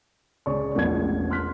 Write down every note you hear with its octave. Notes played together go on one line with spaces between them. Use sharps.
C#2 G#4 C#5 D5 C#6
E1 A1 E2 F3 B3 G#6
C6 F6 F#6 B6